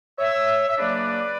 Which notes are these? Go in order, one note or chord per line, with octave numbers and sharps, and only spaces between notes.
C#5 E5
E5
C#3 F#3 A#3 D4 B4 D5